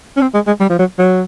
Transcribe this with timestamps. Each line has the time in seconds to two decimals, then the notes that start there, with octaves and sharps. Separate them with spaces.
0.17 C#4
0.21 C4
0.34 G#3
0.47 G#3
0.60 G3
0.70 F3
0.79 F#3
0.99 F#3